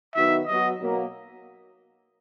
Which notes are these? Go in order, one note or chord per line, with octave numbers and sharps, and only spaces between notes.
D#3 F#3 B3 D#4 F#4 E5
F#3 B3 F#4 D#5
B2 F#3 A#3